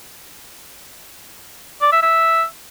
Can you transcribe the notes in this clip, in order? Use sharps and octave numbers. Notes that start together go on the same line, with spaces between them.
D5
E5
E5